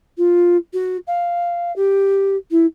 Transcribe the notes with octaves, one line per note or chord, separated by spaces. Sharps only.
F4
F#4
F5
G4
E4